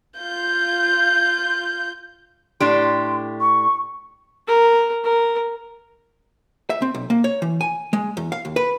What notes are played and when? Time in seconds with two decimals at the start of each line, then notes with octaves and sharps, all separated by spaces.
0.17 F4 G6
2.60 A2 D4 G4 C6
3.40 C#6
4.48 A#4
5.04 A#4
6.70 E5
6.82 C4
6.94 B1
7.10 A#3
7.24 C#5
7.42 E3
7.61 G#5
7.93 G#3
8.17 E2
8.32 F5
8.45 D#2
8.56 B4